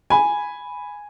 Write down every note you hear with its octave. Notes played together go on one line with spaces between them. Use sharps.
G#5 B5